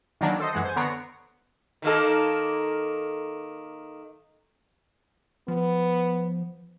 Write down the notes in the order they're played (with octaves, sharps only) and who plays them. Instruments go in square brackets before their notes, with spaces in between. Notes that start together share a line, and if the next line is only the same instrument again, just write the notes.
[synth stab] D#3 E3 F#3 A#3 D4
A4 C5 D#5
F#2 E3 G#3 F#5 C7
C5 G#5
D3 B3 C#5 A#5 C7 D7
[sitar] D#3 A#3 A4
[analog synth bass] F3 [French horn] B3